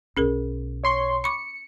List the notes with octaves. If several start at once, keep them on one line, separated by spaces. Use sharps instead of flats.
B1 B2 C#4 G#4 A#4
C#5 C6 C#6
B5 C#6 D6 C#7